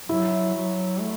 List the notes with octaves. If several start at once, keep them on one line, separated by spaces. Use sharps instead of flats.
F#3 E4
F#3
A3